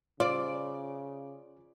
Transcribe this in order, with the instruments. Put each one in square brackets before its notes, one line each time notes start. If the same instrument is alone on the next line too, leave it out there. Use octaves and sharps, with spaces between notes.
[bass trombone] C#3 [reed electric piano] F4 [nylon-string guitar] C5 [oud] D5